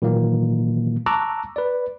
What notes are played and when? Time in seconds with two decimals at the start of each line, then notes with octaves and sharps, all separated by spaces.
0.02 A#2 D#3 E3 F#3 A#3
1.06 A5 A#5 C#6 D6 E6 F#6
1.56 B4 D5